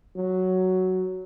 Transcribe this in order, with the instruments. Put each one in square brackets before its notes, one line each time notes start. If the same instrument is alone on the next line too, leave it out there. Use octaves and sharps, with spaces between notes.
[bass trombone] F#3